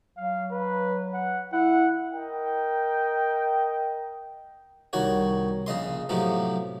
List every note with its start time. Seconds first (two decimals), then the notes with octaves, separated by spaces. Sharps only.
0.18 F#3 F5
0.52 B4
1.14 F#5
1.53 E4 F#5
2.12 A#4 D#5 G5
4.93 C2 D#3 F#4 C#5
5.67 A#1 C#3 D#5 C6
6.09 A2 C3 F3 F#3 B3